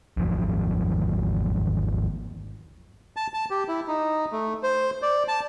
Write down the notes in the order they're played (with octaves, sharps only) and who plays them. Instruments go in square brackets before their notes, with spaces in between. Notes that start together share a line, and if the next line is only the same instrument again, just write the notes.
[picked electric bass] G#1 E2 F3 F#3
[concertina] A5
A5
G4
E4
D#4
A3
C5
D5
A5